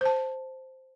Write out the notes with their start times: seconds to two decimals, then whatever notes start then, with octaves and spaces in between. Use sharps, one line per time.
0.01 C5 A5